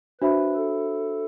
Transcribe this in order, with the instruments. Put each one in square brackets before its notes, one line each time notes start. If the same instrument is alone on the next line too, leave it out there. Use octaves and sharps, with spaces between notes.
[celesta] D4 F#4 C5 E5 B5 [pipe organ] B4
[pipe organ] A4